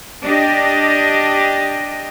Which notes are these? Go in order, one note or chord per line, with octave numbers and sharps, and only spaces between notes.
D4 G4 D#5